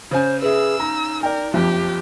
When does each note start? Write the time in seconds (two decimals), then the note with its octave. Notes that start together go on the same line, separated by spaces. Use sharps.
0.11 C#3 C5 G#5
0.42 G#4 B4 E5 E6
0.80 D#4 A#5
1.23 A#4 D5 G5
1.54 F#1 F2 F3 G4